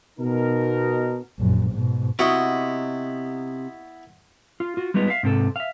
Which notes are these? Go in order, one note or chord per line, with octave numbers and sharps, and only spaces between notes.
B2 D#4 A#4
A#1 F#2
G#2 B2
C3 B3 E4 F#4 D#5
F4
F4 F#4
G3 G#3 B3 D#4 F4
E5 F5
G#2 C3 A4
E5 F5